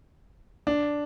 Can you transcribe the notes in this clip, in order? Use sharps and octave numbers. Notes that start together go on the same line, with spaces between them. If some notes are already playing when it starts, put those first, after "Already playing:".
D4